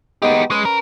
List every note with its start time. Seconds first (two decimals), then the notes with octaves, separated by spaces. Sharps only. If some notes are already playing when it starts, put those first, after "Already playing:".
0.22 G#3 B3 D#4 G4
0.51 G#3 C#4 B4
0.65 A#4